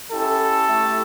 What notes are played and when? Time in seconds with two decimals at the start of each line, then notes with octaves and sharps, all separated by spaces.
0.11 C#4 E4 G4 A4
0.68 A3 E4 G4